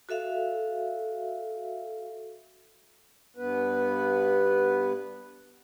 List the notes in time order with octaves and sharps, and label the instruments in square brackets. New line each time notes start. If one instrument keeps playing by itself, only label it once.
[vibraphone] F#4 A4 E5 F5
[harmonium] G2 B3 B4